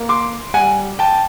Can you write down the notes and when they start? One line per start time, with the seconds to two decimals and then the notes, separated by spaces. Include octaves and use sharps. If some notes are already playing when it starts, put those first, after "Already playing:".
Already playing: A#3
0.09 C6 D6
0.54 G3 F#5 G#5
0.99 G5 A5